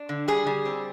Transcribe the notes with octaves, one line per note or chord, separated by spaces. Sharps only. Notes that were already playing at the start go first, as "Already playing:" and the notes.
Already playing: D4
D3
G3 G#4
G3
C4